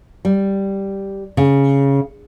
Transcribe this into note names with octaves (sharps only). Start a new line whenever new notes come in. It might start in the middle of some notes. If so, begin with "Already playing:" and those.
G3
C#3